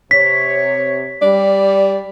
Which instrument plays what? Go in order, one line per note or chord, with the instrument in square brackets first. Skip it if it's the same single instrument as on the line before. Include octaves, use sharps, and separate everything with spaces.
[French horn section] C3 C#5 [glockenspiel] B6
[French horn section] G3 [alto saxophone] D5